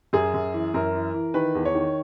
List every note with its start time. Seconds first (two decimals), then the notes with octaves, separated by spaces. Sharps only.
0.13 F#2 G#4
0.34 F#2
0.54 E3
0.74 F#2 A#4
0.95 E3
1.14 E3
1.34 D#3 B4
1.55 E2
1.65 C#5
1.75 D#3